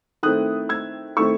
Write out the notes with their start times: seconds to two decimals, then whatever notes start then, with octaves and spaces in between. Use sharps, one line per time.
0.23 D#3 A3 C4 E4 D#6 F#6
0.69 E6 G#6
1.17 D#3 A3 C4 E4 C#6 E6